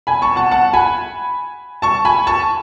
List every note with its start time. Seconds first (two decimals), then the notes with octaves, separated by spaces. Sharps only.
0.07 G#5 B5
0.22 A5 C#6
0.36 F#5 A5
0.51 F#5 A5
0.73 G#5 B5
1.82 A5 C#6
2.05 G#5 B5
2.27 A5 C#6